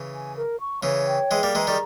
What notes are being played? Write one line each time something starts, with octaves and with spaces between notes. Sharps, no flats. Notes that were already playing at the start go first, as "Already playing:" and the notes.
Already playing: C#3 E3
G#5
A#4
C#6
C#3 E3 C#5
G5
E3 G#3 G#4
G3 A#3
E3 G#3 A#5
D#3 G3